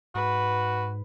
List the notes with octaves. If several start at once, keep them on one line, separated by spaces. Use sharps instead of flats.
G#2 F#4 B4